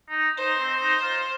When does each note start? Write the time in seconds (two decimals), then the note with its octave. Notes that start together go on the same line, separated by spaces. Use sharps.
0.09 D#4
0.37 D#4 C5
0.59 C4
0.80 D#4
1.02 F4